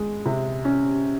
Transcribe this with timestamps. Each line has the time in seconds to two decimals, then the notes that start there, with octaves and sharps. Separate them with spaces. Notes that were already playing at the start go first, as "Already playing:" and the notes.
Already playing: G#3
0.26 C3
0.65 C#4